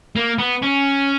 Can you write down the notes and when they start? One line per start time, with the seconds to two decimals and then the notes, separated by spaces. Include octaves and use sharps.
0.16 A#3
0.39 B3
0.63 C#4